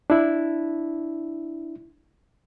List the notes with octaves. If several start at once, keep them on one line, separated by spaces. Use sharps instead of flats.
D4 E4